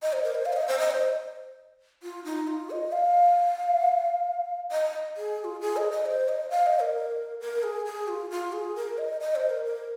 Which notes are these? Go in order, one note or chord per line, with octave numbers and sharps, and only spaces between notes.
D#5
C5
A#4
C5
F5
C5
D#5
C5
D#5
C5
F4
D#4
F4
D#5
F5
D#5
G#4
G#4
F4
G#4
D#5
D#5
C5
D#5
F5
D#5
A#4
A#4
G#4
G#4
F4
F4
G#4
A#4
D#5
D#5
C5
A#4
A#4